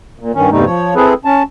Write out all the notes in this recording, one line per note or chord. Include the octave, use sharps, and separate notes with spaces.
A#2
G2 D#3 C#4
E2 G2 C3 G3 A3 D#4
F3 C#5
C4 E4 G#4 A4 B4
C#4 A5